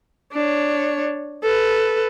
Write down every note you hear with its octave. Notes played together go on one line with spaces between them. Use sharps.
D4 C#5
A4 B4